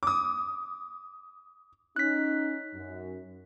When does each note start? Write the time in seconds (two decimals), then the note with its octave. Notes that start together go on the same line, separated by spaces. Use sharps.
0.03 D6 D#6
1.96 C#4 D#4 F#6 B6
2.74 F#2